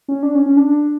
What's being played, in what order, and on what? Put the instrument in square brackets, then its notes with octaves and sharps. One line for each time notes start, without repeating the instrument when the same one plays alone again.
[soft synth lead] C#4
D4
C#4
C#4
D4